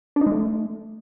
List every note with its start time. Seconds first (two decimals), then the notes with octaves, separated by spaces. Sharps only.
0.16 D4
0.21 D#4
0.27 G#3
0.32 A3